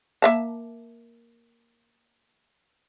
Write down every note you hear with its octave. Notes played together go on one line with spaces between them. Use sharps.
A#3 E5 A5